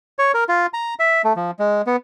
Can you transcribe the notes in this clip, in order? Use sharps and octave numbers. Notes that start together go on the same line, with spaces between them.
C#5
A#4
F4
A#5
E5
A3
F3
G#3
B3